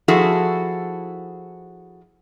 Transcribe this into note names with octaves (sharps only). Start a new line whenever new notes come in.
F3 E4 F#4 G#4 A4